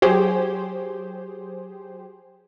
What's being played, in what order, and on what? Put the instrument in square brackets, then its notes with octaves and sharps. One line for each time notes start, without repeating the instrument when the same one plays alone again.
[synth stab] F#3 G4 G#4 C5